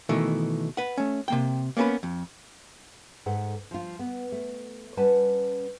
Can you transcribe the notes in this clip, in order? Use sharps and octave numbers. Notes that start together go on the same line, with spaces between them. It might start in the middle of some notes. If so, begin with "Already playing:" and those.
B2 D#3 E3 A3
B4 F#5
A3 C#4
C3 A#3 G5
A#3 B3 C#4 A4 B4
F2
G#2 A4 F#5
F3 F4
B3
A3
G3 C#4 B4 F#5 A5